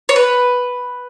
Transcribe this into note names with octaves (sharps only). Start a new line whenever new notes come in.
C#5
B4